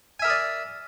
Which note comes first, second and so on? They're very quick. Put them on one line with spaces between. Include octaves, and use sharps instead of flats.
G#5 E5 A#4 D#6 D5